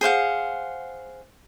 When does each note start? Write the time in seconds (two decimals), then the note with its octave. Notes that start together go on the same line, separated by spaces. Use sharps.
0.01 G#4 C5 F5 F#5